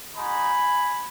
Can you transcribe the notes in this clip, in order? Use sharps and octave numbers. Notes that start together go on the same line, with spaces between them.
G#3 D#4 F#4 G#5 B5